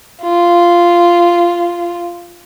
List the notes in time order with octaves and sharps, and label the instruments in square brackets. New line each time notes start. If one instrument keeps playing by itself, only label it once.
[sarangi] F4